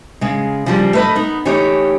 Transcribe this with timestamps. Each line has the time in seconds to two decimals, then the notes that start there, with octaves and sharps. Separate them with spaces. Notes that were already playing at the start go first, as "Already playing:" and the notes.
0.21 C#3 G#3
0.66 C#3 F3 G3
0.93 A3 B4 D#5
1.15 B3 D#4
1.45 E3 A3 D#4 G4 C#5